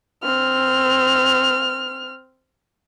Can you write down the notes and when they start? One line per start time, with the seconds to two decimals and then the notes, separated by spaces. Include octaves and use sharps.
0.24 C4 F6